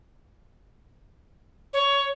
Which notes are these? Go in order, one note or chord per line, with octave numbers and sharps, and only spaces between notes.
C#5